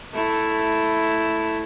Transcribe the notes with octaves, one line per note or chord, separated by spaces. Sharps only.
A3 E4